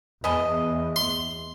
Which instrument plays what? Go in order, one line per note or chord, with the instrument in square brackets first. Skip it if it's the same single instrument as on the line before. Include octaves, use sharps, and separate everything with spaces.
[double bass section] E2 [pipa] B4 G#5 A5 [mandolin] D#5
[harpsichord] C6